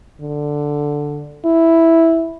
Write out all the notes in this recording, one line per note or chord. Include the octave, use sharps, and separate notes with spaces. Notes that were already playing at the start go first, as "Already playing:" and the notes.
D3
E4